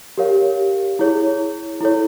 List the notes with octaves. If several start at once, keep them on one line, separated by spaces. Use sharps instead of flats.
G4 A#4 C#5 F5
E4 G#4 C#5
E4 A4 C#5